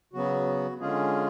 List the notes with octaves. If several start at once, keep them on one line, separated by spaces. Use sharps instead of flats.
C#3 F#3 B3 F#4
D3 G#3 C#4 F4 G#4